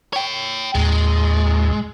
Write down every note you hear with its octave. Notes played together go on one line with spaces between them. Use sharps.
C#5 G5
D#2 A2 G#3